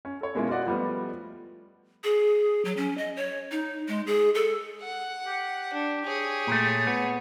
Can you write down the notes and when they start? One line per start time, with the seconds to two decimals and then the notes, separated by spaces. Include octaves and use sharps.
0.05 C#4
0.21 A4 C#5
0.35 B2 G#3 A#3 C#4 E4 F4
0.49 F4 F#4 D5 D#5 F#5
0.67 F3 G3 A3 B3
2.04 G#4
2.65 F#3
2.77 C#4
2.97 D#5
3.16 C#5
3.51 D#4
3.88 G#3
4.07 G#4
4.35 A4
4.82 F#5
5.26 G4
5.73 D4
6.06 G#4 C#5
6.47 A#2 A3
6.87 B3